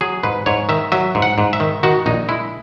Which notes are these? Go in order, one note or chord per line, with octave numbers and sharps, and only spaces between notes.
F#3 G#4
G#2 B4
G#2 C#5
D#3 E5
F#3 E5
G#2
F#5
G#2
E5
D#3
D#3 F#4
A#1 D#4
G#3 E4